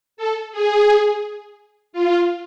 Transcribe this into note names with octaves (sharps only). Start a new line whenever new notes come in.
A4
G#4
F4